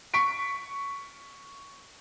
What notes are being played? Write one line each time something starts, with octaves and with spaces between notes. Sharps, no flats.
C#6 B6 D7